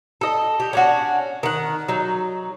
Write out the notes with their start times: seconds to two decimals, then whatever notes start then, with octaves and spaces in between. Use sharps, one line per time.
0.21 A4 D#5
0.60 G4
0.73 C#4 D4 F#4
1.43 D#3 F#5
1.88 F#3 D#4